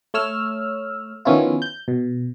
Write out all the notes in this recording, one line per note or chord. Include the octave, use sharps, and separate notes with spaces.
A3 C#5 E6 F6
D#3 F3 B3 C#4 E4 F4
G6
B2